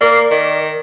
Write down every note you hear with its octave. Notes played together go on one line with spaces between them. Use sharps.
A#3 A#4 D5
D#3